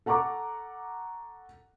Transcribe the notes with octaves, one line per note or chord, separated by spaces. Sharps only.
A4 F#5 A#5 C#6 D6